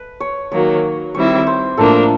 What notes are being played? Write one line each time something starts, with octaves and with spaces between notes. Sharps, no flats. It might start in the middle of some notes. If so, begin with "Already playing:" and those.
Already playing: B4
C#5
D#3 F#3 A#3 C#5
D#3 G3 C4 E4 C#5
C5
A2 F3 A#3 D4 A4